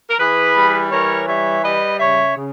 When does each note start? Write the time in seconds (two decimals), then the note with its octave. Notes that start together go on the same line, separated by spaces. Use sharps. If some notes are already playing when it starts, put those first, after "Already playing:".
0.10 A#4
0.19 E3 G#4 B4
0.56 G3
0.91 E3 A#4 C#5
1.27 G3 C#5 E5
1.63 G3 B4 D#5
1.99 C#3 C#5 E5
2.36 C#3